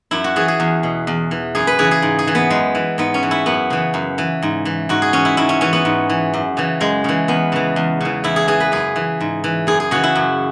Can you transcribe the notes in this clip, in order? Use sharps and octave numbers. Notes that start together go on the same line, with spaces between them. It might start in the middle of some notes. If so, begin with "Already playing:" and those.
F#2 E4
F#4
E3 G#4
G#4
E2
B2
E2
E3
F#2 G#4
B4
C#3 E3 G#4
G#4
G#2
G#4
E3
B3
F#2 G#3
E3
G#2 B3
C#4
E3
E4
F#2 B3
C#3 E3
F#2
E3
G#2
E3
G#2 F#4
G#4
E3 C#4
E4
G#2 E4
C#4
E3 C#4
B3
G#2
E3
F#2
C#3 E3
F#2 G#3
C#3 E3
E2 B3
C#3 E3
E2
C#3 E3
E2 E4
G#4
E3 G#4
B4
F#2 G#4
E3
G#2
E3
F#2 G#4
G#4
C#3 E3 F#4
E4
F#2